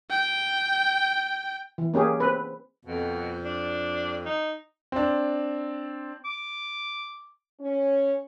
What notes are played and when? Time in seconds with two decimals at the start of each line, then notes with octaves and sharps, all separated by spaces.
0.11 G5
1.78 E3
1.94 A#3 C#4 G4 G#4
2.20 C4 B4
2.85 F2 B2
3.44 D4
4.26 D#4
4.92 C4 D4
6.25 D6
7.60 C#4